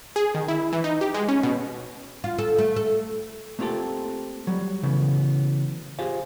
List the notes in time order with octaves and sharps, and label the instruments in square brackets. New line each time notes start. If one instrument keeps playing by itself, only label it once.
[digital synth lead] G#4
D#3
E4
E3
D#4
G4
G#3
C#4
B2
[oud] F4
A4
A3
A4
[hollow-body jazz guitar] A3 A#3 C4 F4 G4 A4
F#3 G3
C#3 E3 F#3 A3 B3
F4 G4 G#4 C5 F5